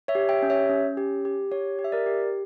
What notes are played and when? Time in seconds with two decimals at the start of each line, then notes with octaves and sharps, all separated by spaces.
0.08 C#5 E5
0.15 G4
0.29 E5 G5
0.43 C#4
0.50 C#5 E5
0.70 C#4
0.97 G4
1.25 G4
1.51 G4 C#5
1.79 G4
1.84 E5
1.92 A#4 D5
2.06 G4